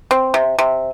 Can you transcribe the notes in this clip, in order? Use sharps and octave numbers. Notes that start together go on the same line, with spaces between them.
C4
C3
C3